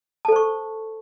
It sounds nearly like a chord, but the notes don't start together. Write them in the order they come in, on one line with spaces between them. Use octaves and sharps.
A5 A4 C5 C#6